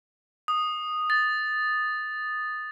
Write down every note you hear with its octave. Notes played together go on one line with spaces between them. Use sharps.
D#6
A6